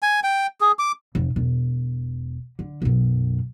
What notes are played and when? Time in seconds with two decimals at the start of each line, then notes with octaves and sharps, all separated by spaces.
0.02 G#5
0.24 G5
0.61 G#4
0.79 D6
1.15 F1
1.36 E1
2.59 D3
2.82 B1 F#2